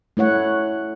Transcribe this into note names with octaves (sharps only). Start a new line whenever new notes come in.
A3 E4 C#5 F#5